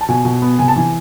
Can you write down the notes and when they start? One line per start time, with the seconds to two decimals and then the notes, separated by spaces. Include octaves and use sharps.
0.01 A5
0.09 B2 G#5
0.25 B2
0.42 B3
0.59 C3 G#5
0.68 A5
0.76 E3 G#5